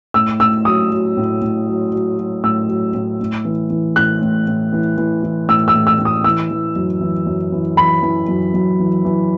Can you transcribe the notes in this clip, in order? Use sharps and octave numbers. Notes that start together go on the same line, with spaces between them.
A2 E6
A2 E6
F#3 D#6
F#3
A2
A2
F#3
F#3
F#3
A2 E6
F#3
A2
A2
E3
E3
A2 F#6
A2
A2
E3
E3
E3
A2 E6
E6
A2
E6
A2
D#6
E3 E6
E3
F#2
E3
F#2
E3
E3 B5
E3
F#2
F#2
E3
E3